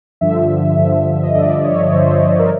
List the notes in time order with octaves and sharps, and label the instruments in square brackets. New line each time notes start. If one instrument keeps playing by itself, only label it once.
[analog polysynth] G2 D3 F3 E5
G2 D3 F3
D#5
G2 D3 F3 D5
C#5
G2 D3 F3 C5
A#4